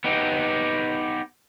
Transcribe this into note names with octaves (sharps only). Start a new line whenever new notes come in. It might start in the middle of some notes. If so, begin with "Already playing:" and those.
B3 D#4 G4